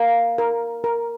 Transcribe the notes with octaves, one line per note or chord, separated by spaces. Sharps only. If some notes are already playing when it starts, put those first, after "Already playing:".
Already playing: A#3 A#4
A#4
A#4